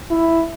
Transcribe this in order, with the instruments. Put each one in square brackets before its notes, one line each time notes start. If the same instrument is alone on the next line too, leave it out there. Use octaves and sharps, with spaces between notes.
[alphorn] E4